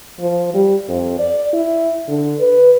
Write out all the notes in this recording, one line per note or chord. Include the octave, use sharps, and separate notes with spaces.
F3
G3
F2
D5
E4
D3
B4